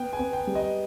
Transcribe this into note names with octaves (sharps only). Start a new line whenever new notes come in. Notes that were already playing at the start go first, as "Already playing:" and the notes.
Already playing: B3 G5
G#5
B3
G5
G3
D#5